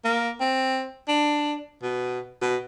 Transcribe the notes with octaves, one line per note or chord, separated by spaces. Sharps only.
A#3
C4
D4
B2
B2